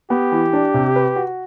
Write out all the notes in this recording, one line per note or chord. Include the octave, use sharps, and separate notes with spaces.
B3 G4
E3
D4
C3
B4
F#4